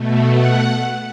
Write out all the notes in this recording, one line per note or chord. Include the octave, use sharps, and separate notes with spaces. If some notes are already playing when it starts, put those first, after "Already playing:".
Already playing: B2 A3
F#5